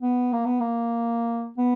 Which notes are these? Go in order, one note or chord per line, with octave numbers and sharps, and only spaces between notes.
B3
A#3
B3
A#3
B3